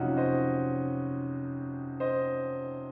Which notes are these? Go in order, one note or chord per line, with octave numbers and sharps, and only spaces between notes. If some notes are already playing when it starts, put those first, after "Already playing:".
Already playing: F2 C3 F#3 C#4 D#4 F4 F#4
C5 D#5
C5 D#5